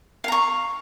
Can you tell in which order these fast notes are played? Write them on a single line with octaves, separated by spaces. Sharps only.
F5 A#5 C#6